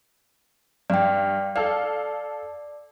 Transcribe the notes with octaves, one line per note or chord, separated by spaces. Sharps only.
G2 D5 G5
A4 D5 F5